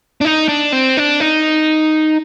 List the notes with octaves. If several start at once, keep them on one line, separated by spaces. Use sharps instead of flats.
D4
D#4
D4
C4
D4
D#4